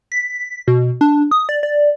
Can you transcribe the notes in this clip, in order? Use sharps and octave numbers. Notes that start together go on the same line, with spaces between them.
B6
B2
D4
D#6
D5
D5